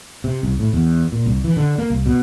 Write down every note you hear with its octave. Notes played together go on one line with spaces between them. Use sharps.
C3
C2
A2
E2
A#2
C2
E3
D3
A#3
C2
B2